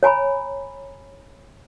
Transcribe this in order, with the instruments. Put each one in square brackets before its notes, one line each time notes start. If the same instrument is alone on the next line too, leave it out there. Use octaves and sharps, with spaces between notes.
[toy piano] C#5 G#5 A#5 B5